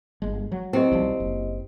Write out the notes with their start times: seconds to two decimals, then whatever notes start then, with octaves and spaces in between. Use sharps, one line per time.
0.22 G1 G#3
0.52 F#3
0.73 C4 E4 G4 D#5
0.91 B1 F3 G3
1.20 F#1